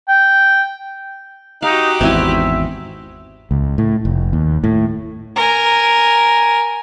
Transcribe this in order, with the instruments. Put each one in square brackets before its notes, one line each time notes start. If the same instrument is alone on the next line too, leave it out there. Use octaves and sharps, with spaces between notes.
[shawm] G5
[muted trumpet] D#4 [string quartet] F#4 G4 F#6 [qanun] F5
[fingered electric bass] G#1 E2 G#2 [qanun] C4 E4 G#5 [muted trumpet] E5
[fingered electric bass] C#2
A2
F1
D#2
A2
[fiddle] A#4 G#5